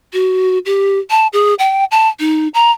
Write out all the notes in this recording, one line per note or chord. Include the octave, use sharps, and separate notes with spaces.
F#4
G4
A5
G#4
G5
A5
D#4
A#5